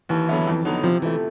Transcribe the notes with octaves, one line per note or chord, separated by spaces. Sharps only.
D#2 E3
D3 F#3 B3 E4
F2
D3 F#3 B3 D#4
C3 F3
E3 F3 A3